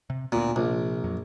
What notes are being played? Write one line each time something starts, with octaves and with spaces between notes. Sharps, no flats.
C3
D2 A#2 B3
A#1 C3 F3
F2 F#3